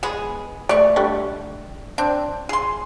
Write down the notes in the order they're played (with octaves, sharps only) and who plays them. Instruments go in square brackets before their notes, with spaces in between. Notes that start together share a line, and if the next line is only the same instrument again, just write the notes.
[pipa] G#3 B3 G#4
[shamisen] A3 [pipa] D5 C#6
[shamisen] D3 G3 A3
[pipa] C4 D4
G#4 C6